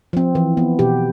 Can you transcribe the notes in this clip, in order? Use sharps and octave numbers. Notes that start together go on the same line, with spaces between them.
F3 C4
E3
B3
B2 G4